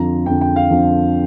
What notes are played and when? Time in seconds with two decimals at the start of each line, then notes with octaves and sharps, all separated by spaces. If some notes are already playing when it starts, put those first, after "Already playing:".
Already playing: F2 D3 F3 A#5
0.26 F2 D3 F3 G5
0.41 G5
0.56 F5
0.70 F2 D3 F3